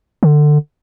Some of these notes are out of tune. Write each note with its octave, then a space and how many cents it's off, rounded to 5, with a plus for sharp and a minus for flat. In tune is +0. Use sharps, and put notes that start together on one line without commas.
D3 +20